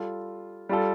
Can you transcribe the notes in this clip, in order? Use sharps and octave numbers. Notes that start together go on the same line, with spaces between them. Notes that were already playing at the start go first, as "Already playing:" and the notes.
Already playing: G3 F4 A4
G3 F4 A4